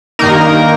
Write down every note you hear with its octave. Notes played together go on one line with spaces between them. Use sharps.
G2 D#3 A#3 D#4 A#4